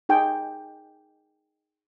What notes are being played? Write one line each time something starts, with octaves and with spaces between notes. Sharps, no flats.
D#4 G#4 G5